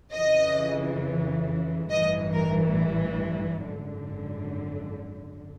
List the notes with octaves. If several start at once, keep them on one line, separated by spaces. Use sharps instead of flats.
F2 C#3 E3 D#5
A1 G2 E3 D#5
A#4
G#1 F#2 D3